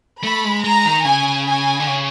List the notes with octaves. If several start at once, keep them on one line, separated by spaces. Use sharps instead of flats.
A3 B5
G#3
G#3 A#5
D#3
C#3 G#5
G#5
D3
C#3